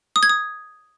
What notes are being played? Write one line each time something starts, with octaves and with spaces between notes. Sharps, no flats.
D#6
G#6
D#6